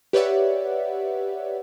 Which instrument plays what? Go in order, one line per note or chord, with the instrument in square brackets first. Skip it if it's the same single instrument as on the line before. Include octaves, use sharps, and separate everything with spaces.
[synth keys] G4 B4 C#5 D5 E5 F#5